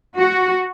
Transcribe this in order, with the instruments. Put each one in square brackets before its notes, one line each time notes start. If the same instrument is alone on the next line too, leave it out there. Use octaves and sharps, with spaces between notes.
[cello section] F#4